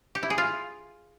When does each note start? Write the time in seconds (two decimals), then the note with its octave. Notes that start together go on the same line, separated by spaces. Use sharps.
0.15 G4
0.23 E4
0.30 G#4
0.38 F4